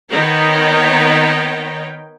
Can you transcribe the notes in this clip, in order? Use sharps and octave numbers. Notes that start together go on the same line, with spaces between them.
D#3 B3 D#4 C#5 G5